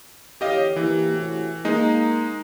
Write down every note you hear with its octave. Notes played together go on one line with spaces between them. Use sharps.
E2 D3 G4 C#5 D#5 F5
E3 A#3 G4
A2 C3 F#4
G#3 A#3 D#4